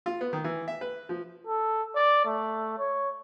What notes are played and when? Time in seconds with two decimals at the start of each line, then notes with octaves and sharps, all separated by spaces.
0.06 F4
0.21 B3
0.33 D#3
0.44 E3
0.68 E5
0.81 B4
1.09 F3
1.47 A4
1.96 D5
2.26 A3
2.78 C#5